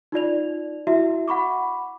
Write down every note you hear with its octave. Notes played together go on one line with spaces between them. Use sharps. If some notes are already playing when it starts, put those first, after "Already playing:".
D#4 F4 D5 F7
E4 F#4 E5
F#5 B5 C#6 D6